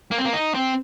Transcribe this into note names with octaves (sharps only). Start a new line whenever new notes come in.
A#3
C4
A#3
D#4
C4